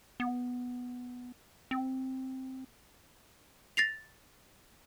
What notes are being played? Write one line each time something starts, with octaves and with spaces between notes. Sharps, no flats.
B3
C4
A6 A#6 C7 F7